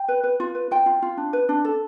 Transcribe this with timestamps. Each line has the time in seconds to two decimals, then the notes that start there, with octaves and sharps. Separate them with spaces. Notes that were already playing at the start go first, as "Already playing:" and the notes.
Already playing: G5
0.08 B4
0.24 B4
0.40 F4
0.55 B4
0.71 F4 G5
0.86 F4
1.02 F4
1.17 D4
1.33 B4
1.49 D4
1.65 A4